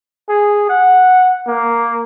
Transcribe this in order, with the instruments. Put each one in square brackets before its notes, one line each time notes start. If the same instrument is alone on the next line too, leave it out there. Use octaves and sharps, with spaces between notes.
[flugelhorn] G#4
F#5
A#3